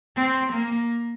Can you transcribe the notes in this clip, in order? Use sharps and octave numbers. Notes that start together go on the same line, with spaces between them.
C4
A#3